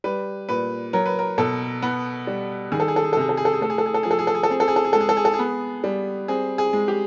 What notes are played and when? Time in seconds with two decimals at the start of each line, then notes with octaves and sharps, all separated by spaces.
0.04 G3 B4
0.49 A#2 B4
0.93 F#3 A#4
1.06 B4
1.19 A#4
1.38 B2 A4
1.82 B3
2.27 G3
2.72 D#3 G#4
2.80 A4
2.88 G#4
2.96 A4
3.04 G#4
3.13 A4
3.17 C3 G#4
3.29 A4
3.37 G#4
3.45 A4
3.54 G#4
3.61 A3 A4
3.70 G#4
3.78 A4
3.86 G#4
3.94 A4
4.03 F3 G#4
4.11 A4
4.19 G#4
4.27 A4
4.35 G#4
4.43 A4
4.50 C4 G#4
4.60 A4
4.68 G#4
4.76 A4
4.85 G#4
4.93 G#3 A4
5.01 G#4
5.09 A4
5.17 G#4
5.25 A4
5.34 G#4
5.39 B3
5.84 G3
6.28 C4 G#4
6.58 G#4
6.73 G#3
6.88 G4